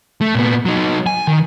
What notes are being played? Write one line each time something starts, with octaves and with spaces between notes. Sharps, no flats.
A3
A#2 B3
F#3 D#4
G#5
D#3